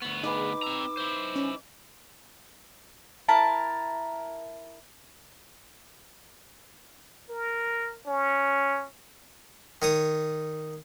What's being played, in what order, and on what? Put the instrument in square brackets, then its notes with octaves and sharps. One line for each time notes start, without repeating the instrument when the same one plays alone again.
[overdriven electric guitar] D2 B3 [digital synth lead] C#6
[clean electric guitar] D#4 B4 [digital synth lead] G#4 [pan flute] D6
[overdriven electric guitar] C4 A#5 [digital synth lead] E6
[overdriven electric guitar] E4 C5
[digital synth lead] C#4
[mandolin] E4 A#4 A5
[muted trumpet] A#4
C#4
[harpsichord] D#3 C#5 D#6